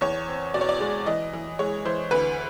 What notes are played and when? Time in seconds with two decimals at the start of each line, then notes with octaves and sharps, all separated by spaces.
0.01 E2 C#5
0.28 C4
0.54 B2 D5
0.61 C#5
0.69 D5
0.80 G#3
1.06 E3 D#5
1.33 E3
1.59 G#3 C#5
1.85 E3 C5
2.11 D2 B4